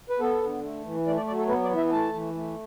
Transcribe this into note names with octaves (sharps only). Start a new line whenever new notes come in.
B4
B3 A4
D3
A3
E3
A3 D5
D5
F#3 D5
A4
B3 B4
D5
E3
E5
A3 A5
E3
A3